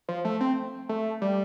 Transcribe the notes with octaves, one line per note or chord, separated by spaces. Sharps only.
F3
A3
C4
A3
G3